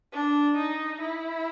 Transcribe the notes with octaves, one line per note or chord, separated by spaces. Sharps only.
D4
D#4
E4